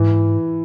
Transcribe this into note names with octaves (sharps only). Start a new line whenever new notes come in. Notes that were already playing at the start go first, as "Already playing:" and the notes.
Already playing: G#2 E3